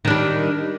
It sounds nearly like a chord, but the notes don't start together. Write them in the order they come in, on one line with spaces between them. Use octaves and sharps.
D#3 D4 G3